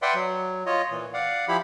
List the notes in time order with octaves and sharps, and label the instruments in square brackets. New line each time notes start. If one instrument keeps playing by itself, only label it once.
[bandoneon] B4 D5 E5 F#5 G5 C6
F#3
F4 C#5 D#5
A#2 E3
D5 F5 F#5
F3 E4 G4 B5